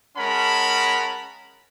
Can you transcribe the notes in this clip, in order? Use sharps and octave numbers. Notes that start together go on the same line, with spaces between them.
G#3 C#4 A#4 F#5 A5 B5